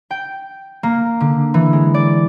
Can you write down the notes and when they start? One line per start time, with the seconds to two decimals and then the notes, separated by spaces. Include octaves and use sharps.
0.11 G5
0.83 A#3
1.20 D3
1.54 E3
1.73 G#3
1.94 D5